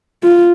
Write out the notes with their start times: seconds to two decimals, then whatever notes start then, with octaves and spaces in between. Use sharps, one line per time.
0.23 F4